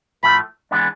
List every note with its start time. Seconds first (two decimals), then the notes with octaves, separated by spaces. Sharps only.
0.23 A2 F3 A3 B5
0.71 E3 G#3 B3 D4